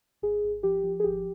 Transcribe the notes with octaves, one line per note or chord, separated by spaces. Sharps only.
G#1 G#4
G#1
F3 G4
F3
G#4
G#1 G4